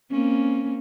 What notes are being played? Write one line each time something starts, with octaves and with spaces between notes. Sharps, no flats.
A#3 C4 C#4